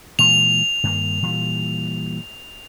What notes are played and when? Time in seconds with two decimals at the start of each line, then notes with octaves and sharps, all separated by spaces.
0.19 A#2 E3 G#3 F7
0.84 G2 D#3 A#3
1.23 A#2 E3 G3